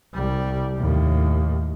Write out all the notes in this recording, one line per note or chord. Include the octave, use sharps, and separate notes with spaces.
C2 G3
D#2 A2